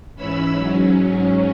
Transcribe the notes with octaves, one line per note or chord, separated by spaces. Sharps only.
G#2 E3 C#4 B5 E6
G#2 F#3 C#4